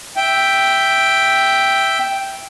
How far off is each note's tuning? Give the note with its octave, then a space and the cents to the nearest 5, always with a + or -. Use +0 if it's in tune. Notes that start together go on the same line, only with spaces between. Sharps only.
E5 +0 G5 +0